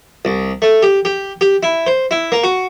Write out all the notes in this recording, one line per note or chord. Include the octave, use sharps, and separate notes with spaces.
C2
A3
G4
G4
G4
E4
C5
E4
A#3
F#4